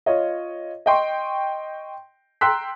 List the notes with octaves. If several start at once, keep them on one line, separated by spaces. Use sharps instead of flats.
F4 C#5 D#5
D#5 G5 C6 C#6
G5 A#5 C6 E6 F#6 B6